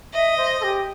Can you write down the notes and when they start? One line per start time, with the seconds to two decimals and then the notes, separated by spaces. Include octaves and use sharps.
0.13 D#5 E5
0.37 C5
0.60 A4
0.63 G4